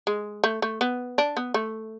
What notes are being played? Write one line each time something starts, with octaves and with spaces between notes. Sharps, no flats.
G#3
A3
A3
B3
D4
B3
A3